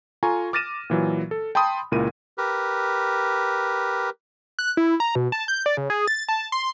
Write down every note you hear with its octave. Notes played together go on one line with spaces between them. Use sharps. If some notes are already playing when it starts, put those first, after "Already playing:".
F4 A4 G#5 A#5 C#6
D6 F6 A6 A#6 D#7 E7
A#2 E3 F#3
A4
G5 A5 B5 C6 D#6
C#2 A#2 E4 A#4 D#7
G4 A#4 B4
F#6
E4
A#5
B2
A5
G6
D5
C#3
G#4
A6
A5
C6